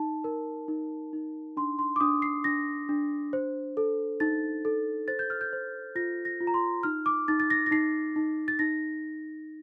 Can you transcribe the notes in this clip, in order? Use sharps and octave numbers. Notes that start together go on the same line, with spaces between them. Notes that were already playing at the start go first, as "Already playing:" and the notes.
Already playing: D#4 A5
A#4
D#4
D#4
D4 C6
C6
D6
D4 D#6
C7
D4 A#6
D4
C5
A4
D#4 A6
A4
C5 A6
G6
F6
G6
C5
F4 A#6
A#6
F4
A#5
C6
D#4 F6
D6
D#4 A6
A6
A#6
A#6
D#4 C7
D#4
A6
D#4 A#6